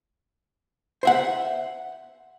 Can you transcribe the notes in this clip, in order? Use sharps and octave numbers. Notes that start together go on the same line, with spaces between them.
C5 E5 F#5